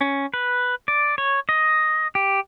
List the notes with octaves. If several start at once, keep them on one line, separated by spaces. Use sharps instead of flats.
C#4
B4
D5
C#5
D#5
G4